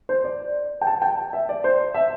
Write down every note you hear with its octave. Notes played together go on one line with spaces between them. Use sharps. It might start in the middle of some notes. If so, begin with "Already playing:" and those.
C5
D5
G5
A5
G5
E5
D5
C5
E5